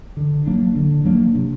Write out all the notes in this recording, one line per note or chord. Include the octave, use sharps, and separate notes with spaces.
D3
F#3 A#3 D4
D3
F#3 A#3 D4
C3